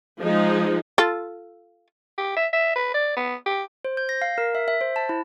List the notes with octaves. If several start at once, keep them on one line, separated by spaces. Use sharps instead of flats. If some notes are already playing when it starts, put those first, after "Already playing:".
F3 G#3 D#4
F4 A4
G4
E5
E5
B4
D5
B3
G4
C5
G6
A#6
F5
A#4
E5
E5
C5
A5
E4